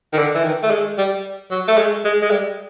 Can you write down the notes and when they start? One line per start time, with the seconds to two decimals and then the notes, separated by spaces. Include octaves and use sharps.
0.13 D#3
0.18 D3
0.35 E3
0.44 D#3
0.63 A3
0.70 G#3
0.98 G3
1.51 F#3
1.68 A3
1.78 G#3
2.05 G#3
2.22 G#3
2.31 G3